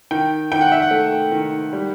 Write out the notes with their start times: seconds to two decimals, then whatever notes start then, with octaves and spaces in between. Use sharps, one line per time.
0.11 D#3 G5
0.52 D#3 G5
0.61 F#5
0.72 E5
0.82 F#5
0.91 A3
1.31 D#3
1.73 G3